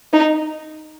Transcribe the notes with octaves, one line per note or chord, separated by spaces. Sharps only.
D#4